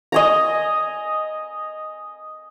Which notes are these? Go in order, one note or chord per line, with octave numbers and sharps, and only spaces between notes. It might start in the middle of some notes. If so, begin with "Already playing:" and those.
D#5 G#5 A#5